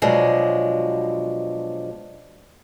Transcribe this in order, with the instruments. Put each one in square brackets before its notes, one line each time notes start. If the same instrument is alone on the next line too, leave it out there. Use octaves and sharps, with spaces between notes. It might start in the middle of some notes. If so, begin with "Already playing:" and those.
[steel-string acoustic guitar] B2 F3 F#3 G#3 D4